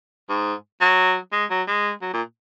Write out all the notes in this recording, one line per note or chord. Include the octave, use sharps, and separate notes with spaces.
G#2
F#3
G#3
F#3
G#3
F#3
A#2